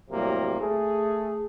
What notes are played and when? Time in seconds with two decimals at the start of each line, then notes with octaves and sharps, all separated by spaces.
0.10 A2 C3 F#3 G3 A#3
0.60 A3 G#4